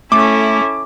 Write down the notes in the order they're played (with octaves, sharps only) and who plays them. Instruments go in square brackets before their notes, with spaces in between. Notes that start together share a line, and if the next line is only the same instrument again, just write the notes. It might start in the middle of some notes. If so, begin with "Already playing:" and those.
[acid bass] A3 [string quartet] C#4 E4 A4 [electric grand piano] D6